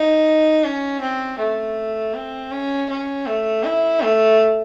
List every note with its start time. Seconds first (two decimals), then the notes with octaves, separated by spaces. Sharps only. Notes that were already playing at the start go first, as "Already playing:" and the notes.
Already playing: D#4
0.63 C#4
1.01 C4
1.39 A3
2.14 C4
2.52 C#4
2.89 C#4
3.26 A3
3.64 E4
4.01 A3